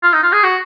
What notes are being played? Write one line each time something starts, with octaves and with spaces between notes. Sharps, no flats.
F4
D#4
F4
G#4
F#4